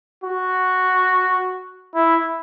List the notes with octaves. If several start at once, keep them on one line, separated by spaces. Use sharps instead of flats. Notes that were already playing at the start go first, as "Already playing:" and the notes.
F#4
E4